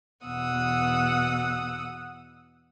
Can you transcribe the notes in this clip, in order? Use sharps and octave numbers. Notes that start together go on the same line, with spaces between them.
E2 B2 F#5 D#6 E6